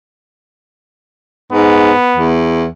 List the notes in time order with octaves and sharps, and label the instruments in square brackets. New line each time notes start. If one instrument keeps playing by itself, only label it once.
[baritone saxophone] G#2 [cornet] B3
[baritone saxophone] E2